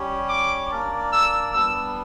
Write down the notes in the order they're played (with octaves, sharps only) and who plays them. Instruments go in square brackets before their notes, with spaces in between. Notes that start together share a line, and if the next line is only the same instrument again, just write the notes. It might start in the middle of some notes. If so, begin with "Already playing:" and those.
Already playing: [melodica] G3 C#4 G4 C#5
[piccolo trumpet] D6
[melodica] A#3 D4 A#4 D5
[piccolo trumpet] E6
[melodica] G3 B3 D4 [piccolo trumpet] E6